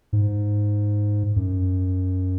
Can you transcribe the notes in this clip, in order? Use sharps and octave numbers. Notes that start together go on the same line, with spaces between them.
G#2
F#2